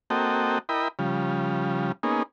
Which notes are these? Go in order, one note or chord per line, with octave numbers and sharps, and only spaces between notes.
A#3 C4 F#4 A4 D#5 G5
E4 A#4 D#5 G5 B5
C#3 F3 G3
A#3 B3 C#4 D#4 G#4